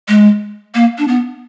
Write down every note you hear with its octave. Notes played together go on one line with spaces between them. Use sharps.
G#3
A#3
D4
B3